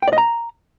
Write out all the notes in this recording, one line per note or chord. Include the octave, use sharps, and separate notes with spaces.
G5
D5
D#5
A#5